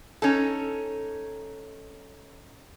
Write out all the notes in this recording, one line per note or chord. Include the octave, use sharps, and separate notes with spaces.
C#4 D#4 A4